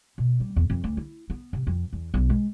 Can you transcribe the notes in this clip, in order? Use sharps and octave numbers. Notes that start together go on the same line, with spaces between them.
B2
G3
E2
F2
D2
E4
B3
C3
F2
E2
B1
G#3